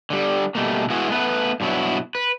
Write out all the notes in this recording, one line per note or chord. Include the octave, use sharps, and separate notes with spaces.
D3 G3
B2 G3 A3 A#3
G#3 B3 E4 F#4
A3 B3 B4
G2 B2 F#3 B3 E4
B4